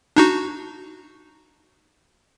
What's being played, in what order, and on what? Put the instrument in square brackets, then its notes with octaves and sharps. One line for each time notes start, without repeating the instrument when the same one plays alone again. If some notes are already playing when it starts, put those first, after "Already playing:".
[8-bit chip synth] D4 D#4 F#4